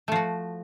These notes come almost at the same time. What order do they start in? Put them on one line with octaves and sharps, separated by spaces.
A3 F3 F#4